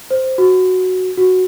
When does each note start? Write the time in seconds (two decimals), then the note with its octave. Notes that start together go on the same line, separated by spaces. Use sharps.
0.10 C5
0.38 F#4
1.18 F#4